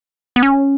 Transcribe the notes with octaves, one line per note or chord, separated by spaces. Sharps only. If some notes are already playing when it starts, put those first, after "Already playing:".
B3
C#4